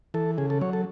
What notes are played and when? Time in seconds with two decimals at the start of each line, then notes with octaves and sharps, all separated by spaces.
0.14 E3 A4
0.38 C#3 G#4
0.50 A4
0.61 F#3 C#5
0.73 A4